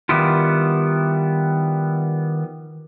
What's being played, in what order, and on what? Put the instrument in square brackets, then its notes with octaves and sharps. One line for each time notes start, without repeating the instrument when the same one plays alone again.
[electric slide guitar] D#3 G3 B3 E4 F4